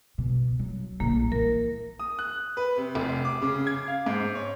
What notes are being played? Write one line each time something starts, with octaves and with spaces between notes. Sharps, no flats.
B2
F#3
A#1 A2 A#3
E3 A#4
D#6
F#6
B4
C3
F1
D6
C#3
G#6
F5
G#2
C#5